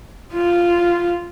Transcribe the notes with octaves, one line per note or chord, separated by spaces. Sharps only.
F4